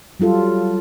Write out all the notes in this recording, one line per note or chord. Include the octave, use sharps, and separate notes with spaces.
F#3 G3 F4 A4